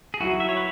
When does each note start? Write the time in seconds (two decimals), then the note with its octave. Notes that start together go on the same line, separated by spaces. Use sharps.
0.14 G#4
0.20 F#3 E4 F#4
0.40 E5
0.49 C#5
0.57 B4